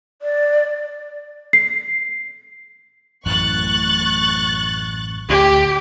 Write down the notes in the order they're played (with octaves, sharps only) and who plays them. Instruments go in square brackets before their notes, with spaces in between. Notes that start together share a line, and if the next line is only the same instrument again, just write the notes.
[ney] D5
[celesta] C7
[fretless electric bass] A1 F#2 A2 [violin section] C#6 F#6 A6
[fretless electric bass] D2 [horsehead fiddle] G4